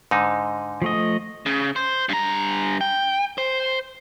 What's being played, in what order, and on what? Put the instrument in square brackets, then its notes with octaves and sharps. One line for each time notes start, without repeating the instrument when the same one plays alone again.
[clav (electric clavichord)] G#2 D3 D#4
[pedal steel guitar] F3 A3 D#5
[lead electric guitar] C#3
C5
G2 A#5
G5
C5